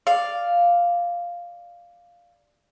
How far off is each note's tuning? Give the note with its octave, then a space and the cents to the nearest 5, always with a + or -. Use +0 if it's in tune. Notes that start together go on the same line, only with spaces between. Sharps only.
D5 +0 F5 +0